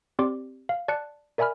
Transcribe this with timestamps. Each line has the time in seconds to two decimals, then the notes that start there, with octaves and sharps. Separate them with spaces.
0.19 C4 G4 D5 C6 D6
0.69 F5
0.88 D5 A5 F#6 C#7
1.38 A#4 D5 E5 G#5 B5 F6